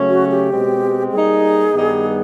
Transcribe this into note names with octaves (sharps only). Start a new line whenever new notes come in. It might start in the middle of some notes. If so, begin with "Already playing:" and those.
Already playing: C#3 F#3 A3 C#4
F#4
G4
B2 G#3 C4
G3 A#3 D#4 G#4
G2 D#3 G3 B3 D#4